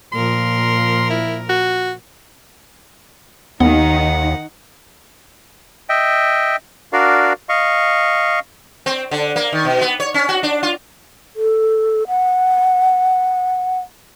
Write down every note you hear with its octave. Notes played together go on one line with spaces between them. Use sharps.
A#2 F3 A#4 C6
E4
F#4
D#2 D#3 B3 D#4 F#5
D#5 E5 G5
D4 F#4 A#4 D5 F5
D#5 F5 C#6
C4
D3
A#3
D#3
B2
B3
C#5
C#4
F#4
D4
F4
A4
F#5